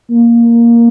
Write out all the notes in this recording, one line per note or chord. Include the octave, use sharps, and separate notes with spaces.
A#3